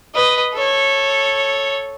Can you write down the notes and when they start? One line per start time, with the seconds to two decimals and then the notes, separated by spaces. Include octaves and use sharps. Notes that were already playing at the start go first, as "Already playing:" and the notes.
0.15 B4 D#5
0.54 A4 C#5